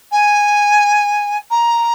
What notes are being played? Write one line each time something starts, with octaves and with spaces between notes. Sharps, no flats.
G#5
A#5